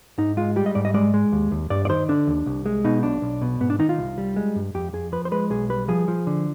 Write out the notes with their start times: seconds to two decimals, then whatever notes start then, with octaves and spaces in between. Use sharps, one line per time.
0.18 G#2 D#4
0.37 G#3 F4
0.56 G3 G4
0.66 D#5
0.75 G#2 D5
0.85 D#5
0.94 G#3 D5
1.14 G#3
1.32 D#2
1.51 D#2
1.70 G2 D5
1.85 D5
1.89 D#3 C5
2.09 D3 D4
2.27 D#2
2.46 C2
2.66 G#3
2.84 B2 D#4
3.03 B1 D4
3.22 B1
3.42 B2
3.60 G#2 B3
3.70 D4
3.79 D#3 D#4
3.89 F4
3.99 C2
4.18 G3
4.36 G#3
4.56 G2
4.75 F2 G4
4.93 F2 G#4
5.12 F3 B4
5.25 C5
5.32 G#3 B4
5.50 B1 G#4
5.70 G3 B4
5.88 F3 G#4
6.08 F3
6.27 D3